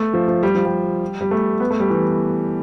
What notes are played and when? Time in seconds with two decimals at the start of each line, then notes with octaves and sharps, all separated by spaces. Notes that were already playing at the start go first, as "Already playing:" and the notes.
Already playing: A3
0.14 F3
0.28 F3
0.43 G3
0.55 F3
0.66 G3
1.21 G3
1.31 A3
1.60 B3
1.71 A3
1.80 G3
1.90 E3